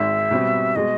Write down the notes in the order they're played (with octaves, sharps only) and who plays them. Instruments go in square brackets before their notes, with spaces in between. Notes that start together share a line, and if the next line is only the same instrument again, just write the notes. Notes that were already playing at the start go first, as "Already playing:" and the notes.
Already playing: [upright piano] G#1 G#2 D#3 G#3 [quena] E5
[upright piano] B2 G3 C4
[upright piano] B2 G#3 [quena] D#5